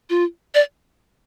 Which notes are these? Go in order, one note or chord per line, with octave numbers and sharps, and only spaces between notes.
F4
D5